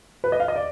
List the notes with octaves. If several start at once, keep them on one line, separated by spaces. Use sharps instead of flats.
B4
D#5
F5
D#5
D5